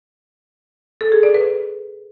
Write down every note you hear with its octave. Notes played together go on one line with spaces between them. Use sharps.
A4
G#4
D5
B4